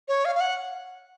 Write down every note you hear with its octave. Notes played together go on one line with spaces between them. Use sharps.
C#5
F5
F5
F#5